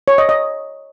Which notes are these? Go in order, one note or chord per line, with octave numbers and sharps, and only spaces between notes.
C#5
D#5
D#5